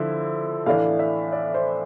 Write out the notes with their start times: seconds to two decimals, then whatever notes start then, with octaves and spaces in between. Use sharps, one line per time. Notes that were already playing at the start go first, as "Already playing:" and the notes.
Already playing: D3 F3 E4 E6
0.66 A2 E3 A3 D4 F5
0.99 E5
1.32 D5
1.54 C5